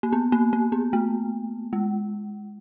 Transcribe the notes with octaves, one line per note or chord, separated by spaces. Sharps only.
A#3
B3
A#3
A#3
B3
A3
G#3